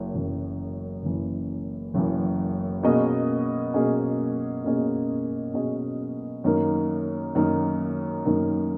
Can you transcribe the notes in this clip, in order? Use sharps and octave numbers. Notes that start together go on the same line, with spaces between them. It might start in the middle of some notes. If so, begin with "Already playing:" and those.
Already playing: F#1 F#2
F#1 F#2 E3
F#1 F#2 E3
F#1 F#2 E3
B2 A#3 C#4 G#4 D#5
B2 A#3 C#4 G#4 D#5
B2 A#3 C#4 G#4 D#5
B2 A#3 C#4 G#4 D#5
F#2 D#3 A#3 D#4 A#4
F#2 D#3 A#3 D#4 A#4
F#2 D#3 A#3 D#4 A#4